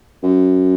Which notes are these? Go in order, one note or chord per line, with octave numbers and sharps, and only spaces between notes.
F#2